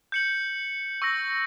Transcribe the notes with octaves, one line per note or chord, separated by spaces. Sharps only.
G6 C#7 F#7
C#6 E6 A#6